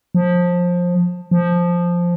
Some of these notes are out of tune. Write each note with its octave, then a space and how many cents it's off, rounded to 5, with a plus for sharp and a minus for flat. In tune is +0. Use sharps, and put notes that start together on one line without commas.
F3 +20
F3 +0